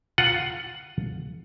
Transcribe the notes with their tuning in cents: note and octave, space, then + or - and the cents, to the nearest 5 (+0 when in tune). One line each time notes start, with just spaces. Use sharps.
F4 +15 F#5 +10